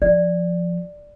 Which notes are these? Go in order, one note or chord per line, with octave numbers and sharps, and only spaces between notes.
F3 D5